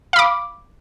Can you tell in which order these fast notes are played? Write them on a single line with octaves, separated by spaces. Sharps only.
F5 B5 D6